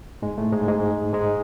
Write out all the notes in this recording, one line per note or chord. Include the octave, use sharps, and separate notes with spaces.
G#2 G#3
A2 A3
G#2 G#3
G#2 G#3
G#2 G#3